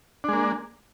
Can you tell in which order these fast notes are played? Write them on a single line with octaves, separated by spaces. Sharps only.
D4 G#3 A#3